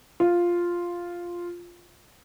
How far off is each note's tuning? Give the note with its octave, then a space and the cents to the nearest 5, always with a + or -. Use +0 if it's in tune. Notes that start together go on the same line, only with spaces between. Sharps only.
F4 +0